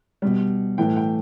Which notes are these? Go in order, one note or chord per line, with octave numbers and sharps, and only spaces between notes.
B2 G3
A2 E3 A3 G5
G5